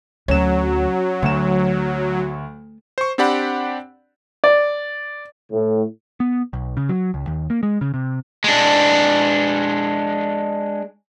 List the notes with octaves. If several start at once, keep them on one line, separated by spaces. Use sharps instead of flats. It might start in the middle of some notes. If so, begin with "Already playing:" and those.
D2 F#3 C#4 E7
D2 A3 E7
C5 C#6
C4 D4 G4 D5 F#5 B5
D5
A2
B3
B1
C#3
F#3
C#2
D#2
A#3
G#3
C#3
C3
G#3 D4